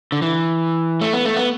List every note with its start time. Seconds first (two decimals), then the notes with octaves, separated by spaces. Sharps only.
0.12 D3
0.22 E3
1.01 A3
1.13 B3
1.25 A3
1.36 B3